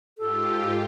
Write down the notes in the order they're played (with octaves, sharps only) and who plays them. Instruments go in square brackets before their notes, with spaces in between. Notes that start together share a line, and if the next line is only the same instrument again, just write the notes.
[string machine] G#2 F4 G4 [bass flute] A4